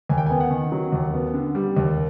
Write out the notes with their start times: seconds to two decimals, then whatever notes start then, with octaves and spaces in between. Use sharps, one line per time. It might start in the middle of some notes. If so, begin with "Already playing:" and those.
0.09 D#2 G#5
0.18 G5
0.26 B3 G#5
0.40 F#5
0.51 D#3
0.72 F#3
0.92 D#2
1.14 B3
1.34 D3
1.55 G3
1.77 D#2